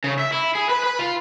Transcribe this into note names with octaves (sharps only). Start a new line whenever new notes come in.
C#3
E5
E4
G#4
B4
B4
F4